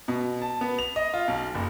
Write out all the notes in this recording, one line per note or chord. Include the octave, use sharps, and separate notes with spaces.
B2
A5
B3
F7
D#5
F4
B1
F#1